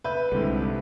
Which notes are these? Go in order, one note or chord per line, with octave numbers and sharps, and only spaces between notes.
B4 E5 G6
C2 G#2 D3